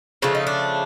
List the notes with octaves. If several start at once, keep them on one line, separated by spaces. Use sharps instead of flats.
C#3 F3 A3 D4
D#4
D4